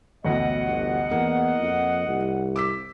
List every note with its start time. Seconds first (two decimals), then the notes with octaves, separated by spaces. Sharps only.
0.25 A1 D2 B2 A3 D#5 F#5
0.65 G1
1.11 E2 A#3
1.61 F2
2.08 C2
2.56 D6 E6 B6